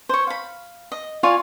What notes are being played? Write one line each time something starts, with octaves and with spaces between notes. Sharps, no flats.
C5 C#5
F5 B5
D#5
F4 C#5 D5 G#5